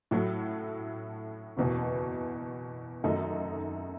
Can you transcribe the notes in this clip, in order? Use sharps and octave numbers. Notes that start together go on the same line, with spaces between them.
A2 F#3 A3
F#1 E2 B2
F#2 D#3 A3 D#4